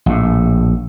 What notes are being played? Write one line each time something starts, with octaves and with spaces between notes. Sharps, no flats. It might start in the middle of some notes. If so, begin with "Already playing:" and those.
A#1 A2